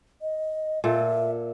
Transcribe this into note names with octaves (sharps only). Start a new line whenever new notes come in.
D#5
A#2 A4 E5